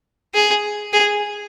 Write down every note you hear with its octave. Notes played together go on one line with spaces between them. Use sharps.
G#4
G#4